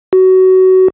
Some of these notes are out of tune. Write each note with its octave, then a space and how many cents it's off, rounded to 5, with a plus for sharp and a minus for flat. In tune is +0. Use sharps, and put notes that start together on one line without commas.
F#4 +20